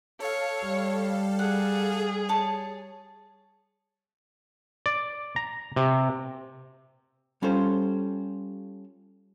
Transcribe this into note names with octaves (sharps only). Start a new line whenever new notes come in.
A4 C#5 F5
G3
G#4 F#5
C#5 A5
D5
A#5
C3
G3 C#4 F4 A4 C5